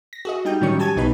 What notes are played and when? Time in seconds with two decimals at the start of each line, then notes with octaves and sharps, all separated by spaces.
0.13 A#6
0.25 F#4 G#4 D#5
0.45 G3 D#4 G5 G6
0.61 A2 D#3 F#3 G3 C#4 C#6
0.79 G4 G#5 A5 G#6 D#7
0.96 B1 B2 D#4 B4 B5